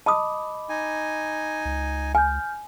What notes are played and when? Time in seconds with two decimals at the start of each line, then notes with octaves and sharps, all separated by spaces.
0.06 D#5 A5 B5 D6 D#6
0.70 D#4 G#5
1.65 C#2
2.15 G#5 F6 G6